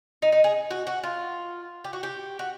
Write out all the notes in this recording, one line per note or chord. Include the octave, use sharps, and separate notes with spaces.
D#4
D#4
G#4
F#4
F#4
F4
G4
F#4
G4
F#4